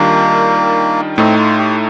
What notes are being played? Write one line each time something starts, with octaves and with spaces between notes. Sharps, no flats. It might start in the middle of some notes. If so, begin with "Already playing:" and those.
Already playing: D#3 G3 A#3 D4 F4
A2 A3 C4 D#4
F4
G4